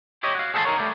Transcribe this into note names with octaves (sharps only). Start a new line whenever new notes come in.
E4 G4 C#5 D#5
F#4 F5
G#4 A4 C5 E5 A5 C6
D#4 A#4 C#5
G3 A3